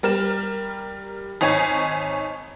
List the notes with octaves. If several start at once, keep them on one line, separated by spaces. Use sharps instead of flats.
G3 A#4 E7
G#1 D#4 C#5 G#5 G#6